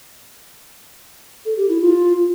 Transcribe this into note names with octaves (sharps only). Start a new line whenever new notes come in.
A4
G4
E4
F4